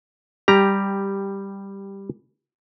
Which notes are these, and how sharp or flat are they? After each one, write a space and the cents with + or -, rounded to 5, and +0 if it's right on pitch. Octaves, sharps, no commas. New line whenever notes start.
G3 +5 G4 +0 A#5 +0